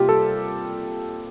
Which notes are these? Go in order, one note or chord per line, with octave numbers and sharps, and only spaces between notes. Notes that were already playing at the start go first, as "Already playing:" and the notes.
Already playing: C3 G3 A#3 F4 G4
A4